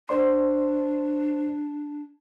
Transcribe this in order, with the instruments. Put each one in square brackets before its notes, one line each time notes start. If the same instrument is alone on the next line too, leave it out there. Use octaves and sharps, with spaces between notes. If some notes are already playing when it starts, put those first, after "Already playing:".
[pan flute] D4 [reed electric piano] C5 D5 C6